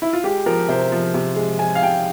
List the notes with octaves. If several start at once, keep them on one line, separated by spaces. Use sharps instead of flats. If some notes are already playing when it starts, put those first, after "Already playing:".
E4
F4
G#3 G4
F3 A#4
C3 C5
F3
C3
G#3
G#3 G#5
F5
C3 G5